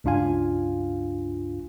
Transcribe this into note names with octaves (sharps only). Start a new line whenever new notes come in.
C#2 G2 D4 F4 F5 G#5